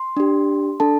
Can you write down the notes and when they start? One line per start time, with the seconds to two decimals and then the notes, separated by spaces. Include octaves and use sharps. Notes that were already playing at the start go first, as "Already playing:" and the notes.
Already playing: C6
0.17 D4 G4
0.80 D4 A4 A5